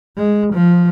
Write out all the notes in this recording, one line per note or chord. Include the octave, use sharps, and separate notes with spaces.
G#3
F3